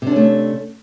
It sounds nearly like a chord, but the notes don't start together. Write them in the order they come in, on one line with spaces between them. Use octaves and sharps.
C3 D4 C#4 A3